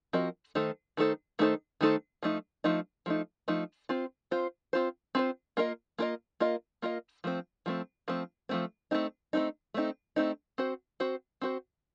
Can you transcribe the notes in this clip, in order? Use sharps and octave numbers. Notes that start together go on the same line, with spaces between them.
F3 C4 F#4 A#4 D#5
D#3 A3 D#4 A4 C5
D#3 A3 D#4 A4 C5
D#3 A3 D#4 A4 C5
D#3 A3 D#4 A4 C5
F3 A3 D#4
F3 A3 D#4
F3 A3 D#4
F3 A3 D#4
C4 F4 C5
C4 F4 C5
C4 F4 C5
C4 F4 C5
A#3 F4 A#4 D#5
A#3 F4 A#4 D#5
A#3 F4 A#4 D#5
A#3 F4 A#4 D#5
F3 A3 C4
F3 A3 C4
F3 A3 C4
F3 A3 C4
A3 C4 D#4
A3 C4 D#4
A3 C4 D#4
A3 C4 D#4
C4 F#4 C5
C4 F#4 C5
C4 F#4 C5